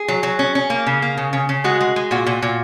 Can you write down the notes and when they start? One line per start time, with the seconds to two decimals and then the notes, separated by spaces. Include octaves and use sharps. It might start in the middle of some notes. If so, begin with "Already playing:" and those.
Already playing: G#4
0.08 F#3
0.23 F#3
0.39 C#4
0.55 C#4
0.70 A#3
0.86 C#3
1.02 A#3
1.17 C#3
1.33 C#3
1.49 C#3
1.64 G#3 F#4
1.81 G#3
1.96 G#3
2.11 A#2 F#4
2.27 A#2
2.42 A#2